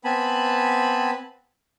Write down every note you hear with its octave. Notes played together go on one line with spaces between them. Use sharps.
B3 C4 G#5 A5 B5